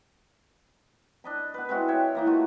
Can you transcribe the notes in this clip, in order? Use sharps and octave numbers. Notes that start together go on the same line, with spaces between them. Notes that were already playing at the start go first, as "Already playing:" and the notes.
D4 D#5 B5
B3 B4
G#3 C4 E4 F#4
C#5 E5 G5
E3 A#3 D#4
A3 F4 F#4 A#5